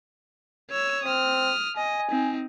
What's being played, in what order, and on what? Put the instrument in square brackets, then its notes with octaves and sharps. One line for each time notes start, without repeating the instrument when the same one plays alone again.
[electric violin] C#5 E6
[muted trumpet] C4 [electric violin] D#6 F6
[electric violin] D#5 [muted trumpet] G#5
[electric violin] C4 D#4